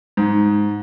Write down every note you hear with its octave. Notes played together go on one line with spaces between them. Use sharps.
G#2